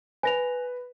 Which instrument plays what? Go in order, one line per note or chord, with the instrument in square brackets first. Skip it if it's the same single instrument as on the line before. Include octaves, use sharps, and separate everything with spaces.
[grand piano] B4 [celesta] G#5 A#6 F7